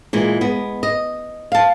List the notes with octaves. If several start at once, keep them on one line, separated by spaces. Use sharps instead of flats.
A#2 E3 G#3
G#3 B3
D#5
F5 A5